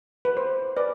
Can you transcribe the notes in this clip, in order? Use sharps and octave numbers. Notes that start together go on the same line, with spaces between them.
B4
C5
B4 D5